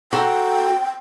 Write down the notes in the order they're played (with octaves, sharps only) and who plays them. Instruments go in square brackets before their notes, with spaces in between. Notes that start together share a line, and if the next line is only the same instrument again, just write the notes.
[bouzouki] F#4 A4 A#5 [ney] G5